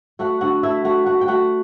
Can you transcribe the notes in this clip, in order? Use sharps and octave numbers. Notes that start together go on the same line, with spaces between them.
A3 F#4 F#5
D3 F#4 F#5
A3 E4 E5
A3 F#4 F#5
A3 F#4 F#5
G5
A3 F#4 F#5